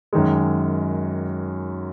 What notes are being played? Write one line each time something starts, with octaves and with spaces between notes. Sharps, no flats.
F#2 D#3 G#3